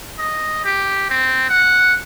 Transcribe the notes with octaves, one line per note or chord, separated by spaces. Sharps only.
D#5
G4
C4
F#5